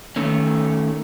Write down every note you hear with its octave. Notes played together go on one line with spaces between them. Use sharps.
D#3 A3 C#4